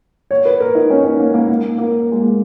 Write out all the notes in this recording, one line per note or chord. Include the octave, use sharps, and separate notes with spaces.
C#5
B4
A#4
D#4
C#4
C#4
A#3
A#3
A#3
A#3
G#3
A#3